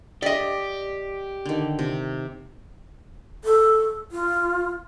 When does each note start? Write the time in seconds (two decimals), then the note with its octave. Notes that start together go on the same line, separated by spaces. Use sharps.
0.22 G4 D5 D#5
1.46 D3 D#3
1.79 C3
3.44 A4
4.12 F4